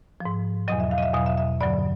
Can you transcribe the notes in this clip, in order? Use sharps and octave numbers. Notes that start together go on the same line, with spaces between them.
F3
G#2
E2 B2 F#3 D#5
E5
F5
D#5
E5
E2 B2 F#3 F5
E5
E5
G2 D3 F#3 D5